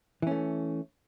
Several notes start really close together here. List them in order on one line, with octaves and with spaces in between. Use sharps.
E3 C#4 A3